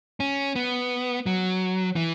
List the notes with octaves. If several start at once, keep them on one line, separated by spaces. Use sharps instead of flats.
C#4
B3
F#3
E3